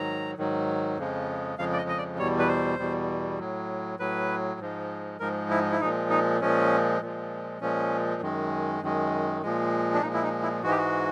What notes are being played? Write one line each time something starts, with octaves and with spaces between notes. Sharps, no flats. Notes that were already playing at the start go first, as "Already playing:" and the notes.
Already playing: G#2 D#3 F#3 A#5
G#2 D#3 F#3
F2 C#3 F3 G#3
F2 C#3 F3 G#3 F5
D5
D#5
D#5
D5
E2 B2 G3 C#5
B4
C5
E2 B2 G3
A2 F#3
A2 F#3 B4
G#2 F3 G#3
G#2 F3 G#3 A#4
E4
E4
A#2 F3 G#3 D#4
D#4
A#2 F3 G#3 C#4
A#2 F3 G#3
A#2 F3 G#3 C#4
F#2 D#3 G#3
F#2 D#3 G#3
A#2 F3 G#3
D4
A#2 F3 G#3 D#4
E4
D#4
E4
G#2 E3 G#3 F#4
G4
F#4